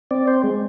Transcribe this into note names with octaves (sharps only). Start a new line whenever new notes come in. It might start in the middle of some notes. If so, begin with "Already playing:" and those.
C4 D5
C5
G#3